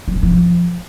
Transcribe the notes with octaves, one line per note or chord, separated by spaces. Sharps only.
F#3
C3
F3